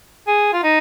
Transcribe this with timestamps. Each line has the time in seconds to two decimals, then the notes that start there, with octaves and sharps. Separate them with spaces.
0.28 G#4
0.53 F4
0.63 D#4